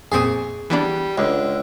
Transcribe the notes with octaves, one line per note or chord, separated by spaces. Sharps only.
F2 A#2 C4 G#4 C#6 D#6
E3 G3 B3 D4
C#2 D3 G#3